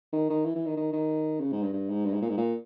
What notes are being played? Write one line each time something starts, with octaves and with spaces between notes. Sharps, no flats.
D#3
D#3
E3
E3
D#3
D#3
D#3
C#3
G#2
G2
G2
G#2
G2
G#2
A#2
G#2
A#2